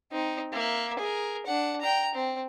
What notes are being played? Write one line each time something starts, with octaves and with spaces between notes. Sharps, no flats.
C4 D#4
A#3 E5
G#4 A#4
D4 F#5
G5 A#5
C4